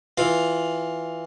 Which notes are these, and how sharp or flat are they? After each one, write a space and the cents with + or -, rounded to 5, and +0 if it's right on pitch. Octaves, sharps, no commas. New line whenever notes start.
E3 +0 F4 +5